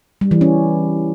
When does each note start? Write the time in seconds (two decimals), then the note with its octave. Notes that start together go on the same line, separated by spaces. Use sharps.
0.21 G3
0.31 E3
0.41 C#4